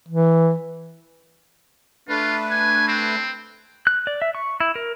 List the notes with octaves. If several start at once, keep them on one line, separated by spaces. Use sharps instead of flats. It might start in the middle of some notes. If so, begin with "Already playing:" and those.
E3
A3 D4 F4 B4
G#5
C4
F#6
D5
E5
C#6
E4
A#4